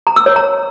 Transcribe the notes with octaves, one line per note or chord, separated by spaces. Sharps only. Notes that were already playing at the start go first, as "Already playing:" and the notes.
A#5
E6
C#5
A#5